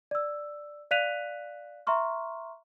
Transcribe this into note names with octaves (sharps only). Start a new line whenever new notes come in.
D5 E6
D5 F5 F#6 B6 D#7 F7
E5 A#5 C6 C#6 F6